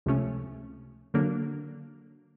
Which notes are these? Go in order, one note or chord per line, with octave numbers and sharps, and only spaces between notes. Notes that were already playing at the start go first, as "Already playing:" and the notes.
C#2 C3 F3 A3 C#4
D3 F#3 A#3 D4